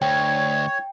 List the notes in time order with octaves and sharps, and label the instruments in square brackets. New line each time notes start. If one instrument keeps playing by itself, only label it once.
[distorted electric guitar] D2 [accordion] C#5 [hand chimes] G5